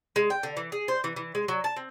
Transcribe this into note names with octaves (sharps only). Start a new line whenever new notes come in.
G#3
G5
D3
E3
G#4
C5
E3
E3
G#3
F#3
A5
C4